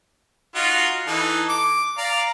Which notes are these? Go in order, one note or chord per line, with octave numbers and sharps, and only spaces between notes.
D#4 F4 F#4
E3 D#4 A4
D6
D5 F5 A#5